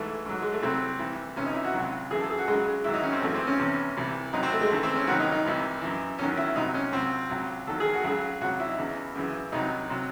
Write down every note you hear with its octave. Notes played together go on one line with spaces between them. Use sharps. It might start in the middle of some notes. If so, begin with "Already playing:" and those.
Already playing: G#2 E3 A3
G#2 F#3
G#3
A3
C2 C3 F#3 C4
C2 C3 E3
C2 C3 E3 C#4
D#4
E4
F#4
C#2 C3 F#3
F#2 E3 G#4
A4
G#4
F#4
C#2 C#3 F#3 G#3
G#2 D#3 F#3 E4
D#4
C#4
C4
F#2 C#3 E3 A3
C4
C#4
E2 C3 E3
C2 C3 E3
C2 C3 F#3 D#4
C4
A3
G#3
D#2 C#3 E3 A3
C4
C#4
C2 C3 D#3 F#3 F#4
D#4
D#4
C2 C3 E3
F#2 E3
E2 D#3 F#3 C#4
E4
C2 C3 F#3 D#4
C#4
C#2 C3 F#3 C4
C#2 C3 F#3
E2 D#3 F#3 A4
G#4
F#4
C#2 C#3 F#3 G#4
C#2 C3 F#3 F#4
E4
D#4
E2 C#3 E3
F#2 C#3 E3
C2 C3 F#3 D#4
C3 F#3